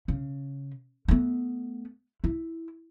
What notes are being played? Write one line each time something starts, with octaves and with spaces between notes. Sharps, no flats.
C#3
A3 B3
E4